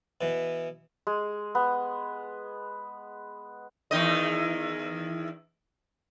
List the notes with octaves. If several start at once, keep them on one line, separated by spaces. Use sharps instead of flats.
B2 E3
G#3
B3
E2 D#3 D#5